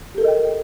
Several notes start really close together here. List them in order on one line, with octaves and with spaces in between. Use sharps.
G4 A4 A#4 D#5 G5